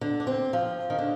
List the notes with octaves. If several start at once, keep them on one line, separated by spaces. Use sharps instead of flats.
D3
D4
C4
F3
D#3
D3